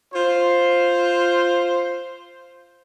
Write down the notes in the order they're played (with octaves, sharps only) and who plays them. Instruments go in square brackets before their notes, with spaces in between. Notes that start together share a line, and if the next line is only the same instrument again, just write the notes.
[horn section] F4 C5